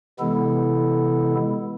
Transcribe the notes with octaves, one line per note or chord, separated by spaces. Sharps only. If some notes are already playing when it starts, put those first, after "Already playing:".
C3 E3 G#3 B3 E4 A4